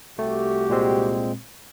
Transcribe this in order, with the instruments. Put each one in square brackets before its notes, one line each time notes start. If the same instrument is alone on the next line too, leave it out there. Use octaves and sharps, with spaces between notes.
[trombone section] C2 F#4 G4 [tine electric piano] A3
[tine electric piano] A#2 G#3 C4